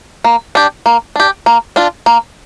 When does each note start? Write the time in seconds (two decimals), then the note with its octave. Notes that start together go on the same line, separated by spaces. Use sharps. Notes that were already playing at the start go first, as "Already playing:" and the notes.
0.24 A#3
0.55 D4 G4
0.86 A#3
1.16 D4 G4
1.46 A#3
1.76 D4 F4
2.06 A#3